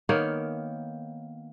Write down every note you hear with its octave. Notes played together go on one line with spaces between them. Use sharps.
D#3 A#3 B3 C#5